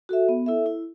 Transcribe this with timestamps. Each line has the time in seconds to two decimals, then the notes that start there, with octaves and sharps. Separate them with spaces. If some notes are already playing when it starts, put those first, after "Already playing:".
0.09 F#4 A4 E5
0.29 B3
0.46 E4 A4 E5
0.66 E4